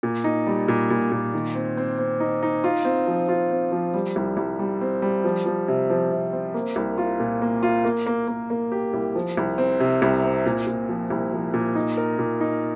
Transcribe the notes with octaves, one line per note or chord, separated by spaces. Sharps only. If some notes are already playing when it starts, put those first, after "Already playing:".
A#2
D#4
G3
A#2
A#2
A#2
D#3
C4
C4
C4
D#4
D#4
F4
C4
F3
F4
C4
F3
G3
C2
C2
G3
C4
G3
F3
F3
C3
F3
C3
C4
A#3
C2
F4
A#2
A#3
F4
A#3
A#3
A#3
A#3
G4
C2
F3
C2
C4
C3
C2
C4
A#2
A#2
F3
C2
F3
A#2
D#4
A#4
A#2
D#4